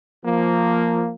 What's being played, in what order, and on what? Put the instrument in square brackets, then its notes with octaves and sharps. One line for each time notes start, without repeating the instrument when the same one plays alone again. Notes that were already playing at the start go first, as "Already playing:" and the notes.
[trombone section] F3 A#3